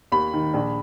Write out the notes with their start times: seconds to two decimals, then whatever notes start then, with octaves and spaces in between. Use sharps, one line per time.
0.12 D#2 B5
0.33 D#3
0.54 A#1